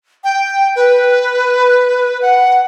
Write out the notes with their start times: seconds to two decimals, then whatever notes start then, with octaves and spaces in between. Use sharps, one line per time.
0.24 G5
0.76 B4
2.22 F#5